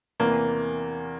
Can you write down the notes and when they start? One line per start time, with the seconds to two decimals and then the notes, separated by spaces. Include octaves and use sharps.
0.20 E2 C3 E3 A#3